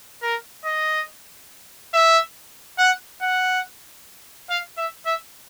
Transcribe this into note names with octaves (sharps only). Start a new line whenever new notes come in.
A#4
D#5
E5
F#5
F#5
F5
E5
E5